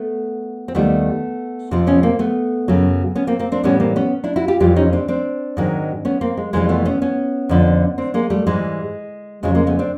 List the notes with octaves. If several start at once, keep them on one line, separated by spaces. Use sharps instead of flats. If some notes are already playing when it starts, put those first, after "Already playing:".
Already playing: A3 B3
C4
D#2 D#3 G3 A3 B3
F2 C3 F3
B3 C#4
A#3 C4
A3 B3
F#2 C#3 F#3
B3 C#4
A#3 C4
A#3 C4
C4 D4
A2 E3 G3 B3 C#4
A#3 C4
B3 C#4
D4 E4
E4 F#4
F4 G4
F2 C3 E3 G3 F4 G4
C#4 D#4
C4 D4
C4 D4
G#2 D#3 F#3
B3 C#4
A#3 C4
G#3
F2 C3 E3 G3 G#3 A#3
A3 B3
B3 C#4
B3 C#4
F2 D3 F3
C4 D4
G#3 A#3
G3 A3
G#2 E3 G3 G#3
F2 C#3 F#3 G#3
G#3 A#3
A3 B3
C4 D4